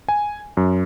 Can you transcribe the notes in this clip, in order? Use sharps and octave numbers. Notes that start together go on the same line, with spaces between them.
G#5
F#2